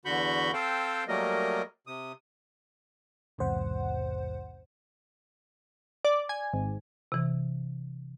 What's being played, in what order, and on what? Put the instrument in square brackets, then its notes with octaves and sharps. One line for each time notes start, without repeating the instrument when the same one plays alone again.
[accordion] E2 D3 F#4 B5 C#6 G6
C4 A4 C5 F5 G5
F#3 G3 A3 A#3 A#4 D#5
C3 D#6
[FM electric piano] B1 E2 G#2 C3 C5 F#5
[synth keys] D5
G#5
G#1
[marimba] C3 E3